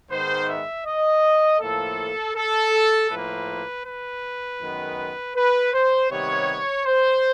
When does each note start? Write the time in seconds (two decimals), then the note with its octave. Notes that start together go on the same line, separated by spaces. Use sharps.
0.10 G#2 D#3 G#3 B3 C5
0.48 E5
0.85 D#5
1.60 A2 F3 A#3 A4
2.35 A4
3.10 A2 F3 A#3 B4
3.84 B4
4.60 F#2 D#3 G#3 B3
5.35 B4
5.73 C5
6.10 C3 D#3 G3 B3 C#5
6.85 C5